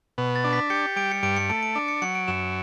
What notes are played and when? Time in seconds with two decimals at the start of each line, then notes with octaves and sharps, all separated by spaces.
0.18 B2
0.36 A6
0.44 D4
0.53 B6
0.70 G4 C#7
0.96 G3 D7
1.12 C#7
1.23 G2 D7
1.37 C#7
1.49 A3 D7
1.63 D7
1.75 D4 D7
1.88 C#7
2.02 F#3 C#7
2.15 D7
2.28 F#2 E7